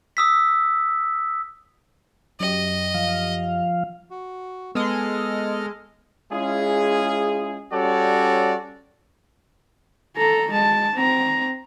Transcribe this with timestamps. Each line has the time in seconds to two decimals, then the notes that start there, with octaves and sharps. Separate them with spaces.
0.17 D#6 E6 B6
2.40 F#2 G4 D#5
2.94 F3 F5
4.11 F#4
4.75 G#3 B3 A4 D#5 F6
6.31 G#3 C#4 E4 F4 G#4
7.72 G3 C#4 F#4 A4 C#5 D5
10.16 A4 A#5
10.51 G#3 A5
10.94 C4 A#5